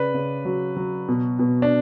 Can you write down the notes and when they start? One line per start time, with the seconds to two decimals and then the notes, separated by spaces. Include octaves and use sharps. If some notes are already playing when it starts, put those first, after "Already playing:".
Already playing: C#3 B4 D5
0.14 C#3
0.45 F#3
0.76 F#3
1.08 B2
1.39 B2
1.62 D4